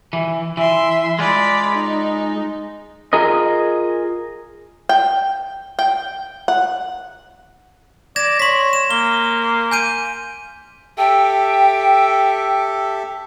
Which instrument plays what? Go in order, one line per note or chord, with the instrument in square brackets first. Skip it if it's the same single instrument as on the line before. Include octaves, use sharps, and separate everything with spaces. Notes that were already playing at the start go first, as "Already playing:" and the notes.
[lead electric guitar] E3
[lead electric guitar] E3 [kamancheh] E5 C6
[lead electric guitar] G#3 F4 [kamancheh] D5 B5
[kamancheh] D#4
[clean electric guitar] F4 G#4 A#4 D#5
[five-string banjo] G5
G5
F#5
[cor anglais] D5 [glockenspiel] G#6 A#6 E7
[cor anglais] C#5 [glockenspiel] C6 B6
[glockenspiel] E7
[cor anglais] A#3 [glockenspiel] G7
[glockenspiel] G#5 G6 D#7
[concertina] G4 A4 E5 [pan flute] G5